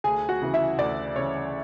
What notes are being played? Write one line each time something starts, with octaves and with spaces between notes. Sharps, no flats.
D2 G#4 G#5
F#4 F#5
C#3 E3
E4 E5
D2 D5
C#3 E3 C#5